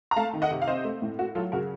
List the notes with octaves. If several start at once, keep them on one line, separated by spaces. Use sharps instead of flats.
A#5
A3 F5 A5
D#3
D#5 F#5
C3
F5
C4 C5 D#5
A3
A2
A3 F#4
F#3 F4 A4
C#3 F#4 A#4